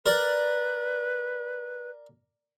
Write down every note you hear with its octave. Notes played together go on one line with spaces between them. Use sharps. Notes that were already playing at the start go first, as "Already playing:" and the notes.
A#4 B4 D5